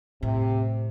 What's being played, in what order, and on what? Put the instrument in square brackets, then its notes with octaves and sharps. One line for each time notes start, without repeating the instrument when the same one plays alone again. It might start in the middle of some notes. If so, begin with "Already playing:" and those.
[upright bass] A2 [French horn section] C3